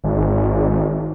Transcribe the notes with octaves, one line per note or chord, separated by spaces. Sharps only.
G#1